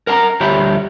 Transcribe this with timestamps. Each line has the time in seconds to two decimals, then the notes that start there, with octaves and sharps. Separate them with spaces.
0.07 A#4 F#5 A5 A#5
0.40 D2 G3 G4 C#5 E5 B5